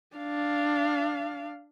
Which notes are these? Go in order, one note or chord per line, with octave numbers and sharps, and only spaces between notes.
D4 F5